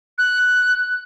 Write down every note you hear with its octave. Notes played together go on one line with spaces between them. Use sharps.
F#6